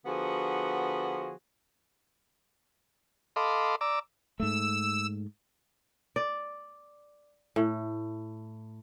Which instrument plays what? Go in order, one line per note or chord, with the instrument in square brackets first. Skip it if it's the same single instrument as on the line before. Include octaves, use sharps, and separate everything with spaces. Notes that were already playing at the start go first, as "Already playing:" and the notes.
[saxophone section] D3 F3 B3 F#4 G#4
[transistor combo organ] A4 D#5 F5 B5 C6 D6
D5 A#5 D6 E6
[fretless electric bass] G#2 A3 [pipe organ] E6
[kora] D5
A2